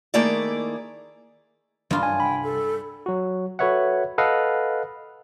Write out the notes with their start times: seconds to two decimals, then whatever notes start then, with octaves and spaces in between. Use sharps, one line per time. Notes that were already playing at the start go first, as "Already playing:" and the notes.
0.14 D#3 A3 A#3 E4 G#4 D5
1.91 G2 D#3 G#3 A3 F4
2.03 F#2 D#3 G#5
2.20 C2 G5 B5
2.43 A4
3.06 F#3 F#4
3.59 F#4 A4 B4 C#5 E5 F#5
4.18 A4 B4 D#5 F5 F#5